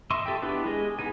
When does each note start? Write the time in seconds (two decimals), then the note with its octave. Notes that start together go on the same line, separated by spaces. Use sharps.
0.10 D#5 E5 C6 C#6
0.26 G4 A4 E5 G5
0.42 B3 D4 E4 G4 B4
0.65 G#3 G#4 D#5
0.99 B3 D#4 G#5